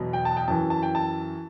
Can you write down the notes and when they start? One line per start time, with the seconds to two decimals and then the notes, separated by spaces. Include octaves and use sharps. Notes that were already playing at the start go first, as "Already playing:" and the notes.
Already playing: E2 B2 F#3
0.13 G5
0.25 A5
0.37 G5
0.48 F#2 E3 A5
0.70 A5
0.83 G5
0.95 A5